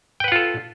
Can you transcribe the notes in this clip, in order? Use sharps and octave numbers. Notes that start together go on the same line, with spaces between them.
F4 A4 B4 F#5 G5